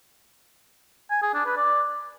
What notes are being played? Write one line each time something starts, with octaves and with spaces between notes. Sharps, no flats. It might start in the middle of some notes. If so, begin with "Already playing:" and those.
G#5
G#4
D4
B4
D5